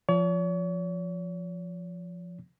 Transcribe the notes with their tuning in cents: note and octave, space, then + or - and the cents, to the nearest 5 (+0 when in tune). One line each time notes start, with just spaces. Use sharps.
F3 +0 C#5 +40